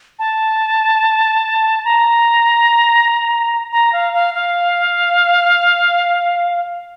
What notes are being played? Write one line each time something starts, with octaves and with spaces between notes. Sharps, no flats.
A5
A#5
A#5
F5
F5
F5